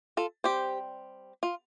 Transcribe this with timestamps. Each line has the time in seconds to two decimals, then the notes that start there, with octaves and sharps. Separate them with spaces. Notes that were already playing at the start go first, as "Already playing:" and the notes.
0.17 F4 A4
0.44 G3 C4 G4 C5
1.43 F4